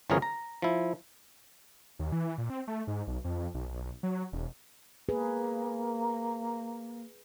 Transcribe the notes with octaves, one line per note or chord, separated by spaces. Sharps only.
G1 E3 F3 C#4 G#4 A#4
A#5
F3 E4
D#2
E3
A#2
C4
A3
G#2
B1
F2
B1
B1
F#3
E1
A#3 G#4 B4